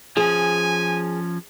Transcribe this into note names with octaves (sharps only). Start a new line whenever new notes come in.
F3 C#4 G#4 G#5